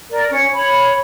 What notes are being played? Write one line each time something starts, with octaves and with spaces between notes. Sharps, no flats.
A#4 D5
C#4
C#5 B5